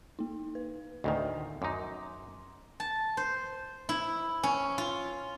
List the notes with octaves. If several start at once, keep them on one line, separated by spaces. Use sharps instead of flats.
A#3 D#4
B4
D2 A2 D#3 D#5 G#5
F#2 D#4 C6 D6
A5
C5
E4
C#4
F4